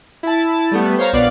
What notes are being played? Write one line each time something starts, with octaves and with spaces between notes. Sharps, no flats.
E4 A5
G3 A3 B3
C5 C#5 F5 A#5 C#6
A#1 B3 D5 F5 F#6